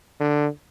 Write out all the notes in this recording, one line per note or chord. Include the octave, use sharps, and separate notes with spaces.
D3